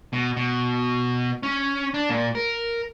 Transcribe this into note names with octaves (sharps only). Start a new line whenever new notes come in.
B2
B2
C#4
D4
A#2
A#4